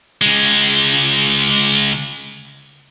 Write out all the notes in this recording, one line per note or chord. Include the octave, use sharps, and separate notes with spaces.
C#2 G#3